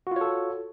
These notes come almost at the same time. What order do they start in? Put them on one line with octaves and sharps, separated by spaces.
F#4 F4 C#5 A4